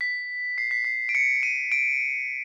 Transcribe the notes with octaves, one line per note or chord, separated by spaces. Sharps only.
B6
C7
B6
C7
D7
C#7
D#7
D7